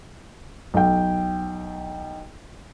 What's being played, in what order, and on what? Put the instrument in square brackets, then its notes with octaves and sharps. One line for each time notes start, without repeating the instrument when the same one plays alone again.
[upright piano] B1 G5